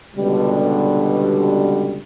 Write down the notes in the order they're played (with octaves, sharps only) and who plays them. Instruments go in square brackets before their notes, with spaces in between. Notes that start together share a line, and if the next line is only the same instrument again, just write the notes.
[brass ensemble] C#2 B2 D3 G3